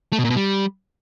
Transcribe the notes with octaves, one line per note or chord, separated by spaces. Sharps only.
A3
B2
A#2
B2
G3